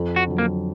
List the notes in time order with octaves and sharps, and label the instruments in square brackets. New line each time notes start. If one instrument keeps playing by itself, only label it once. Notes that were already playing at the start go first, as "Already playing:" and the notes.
Already playing: [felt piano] F2
[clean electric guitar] F#4
[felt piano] D3 F#3
[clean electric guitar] A#3